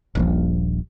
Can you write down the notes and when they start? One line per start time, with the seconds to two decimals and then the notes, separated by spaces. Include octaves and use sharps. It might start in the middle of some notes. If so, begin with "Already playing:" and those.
0.15 D#1 A#1 F3